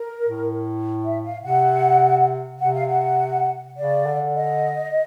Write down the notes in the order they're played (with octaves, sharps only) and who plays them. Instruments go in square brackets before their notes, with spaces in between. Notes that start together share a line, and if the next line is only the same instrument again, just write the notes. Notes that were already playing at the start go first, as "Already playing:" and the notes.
Already playing: [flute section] A#4
[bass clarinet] A2
[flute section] E5
F5
[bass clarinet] C3 [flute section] F#5
[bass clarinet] C3 [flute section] F#5
[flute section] F5
F#5
[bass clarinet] C#3 [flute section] D5
[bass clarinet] D3
[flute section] D#5